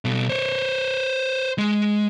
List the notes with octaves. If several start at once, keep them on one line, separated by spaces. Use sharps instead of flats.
B2 A4
C5 C#5
G#3